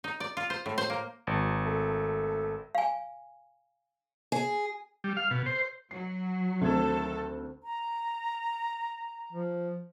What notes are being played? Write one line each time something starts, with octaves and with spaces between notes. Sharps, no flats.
D#4
D5
F4
C5
A2
C5
A#3
G#1
A3
F5 G#5
G#4
G3
F5
B2
C5
F#3 C7
D2 D#3 C4 A4 A5 G#6
A#5
F3